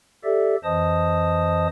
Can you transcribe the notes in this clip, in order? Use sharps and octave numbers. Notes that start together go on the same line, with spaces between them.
G4 A4 D5 E5
F2 E3 C5 D#5 A5 D#6